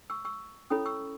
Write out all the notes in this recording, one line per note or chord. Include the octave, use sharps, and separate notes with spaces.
C#6 E6
C#6 E6
C#4 E4 A4 C#5 B5 D#6
C#6 E6